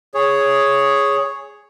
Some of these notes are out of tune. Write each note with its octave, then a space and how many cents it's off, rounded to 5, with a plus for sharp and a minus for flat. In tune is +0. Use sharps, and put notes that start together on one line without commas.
G#4 +0 C#5 +0